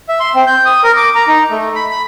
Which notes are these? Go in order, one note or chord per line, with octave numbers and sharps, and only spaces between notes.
E5
C6
C4
G6
D#6
A#4
D6
A#5
D#4
A3
B5
B5